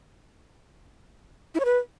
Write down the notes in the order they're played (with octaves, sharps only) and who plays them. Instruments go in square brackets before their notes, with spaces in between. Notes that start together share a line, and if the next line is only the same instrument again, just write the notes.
[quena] E4
C#5
B4